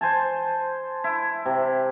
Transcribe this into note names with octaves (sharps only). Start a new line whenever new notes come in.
C5 G#5 A5
E4
C3